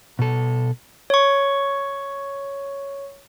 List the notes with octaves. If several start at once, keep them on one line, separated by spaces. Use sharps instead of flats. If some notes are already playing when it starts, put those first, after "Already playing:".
B2 A4
C#5 C#6